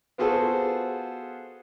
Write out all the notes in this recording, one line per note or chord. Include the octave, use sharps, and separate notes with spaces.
B3 F4 F#4 G#4 A4 C5